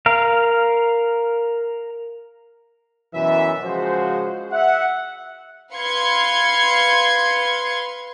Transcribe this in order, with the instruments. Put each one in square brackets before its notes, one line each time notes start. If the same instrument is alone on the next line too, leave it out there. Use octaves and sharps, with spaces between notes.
[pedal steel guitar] A#4 F5
[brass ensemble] F#2 B2 E3 E5
C#3 F3 G#3 F4 F#4 C5
E5 F#5
[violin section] B4 F5 C6 G#6 C#7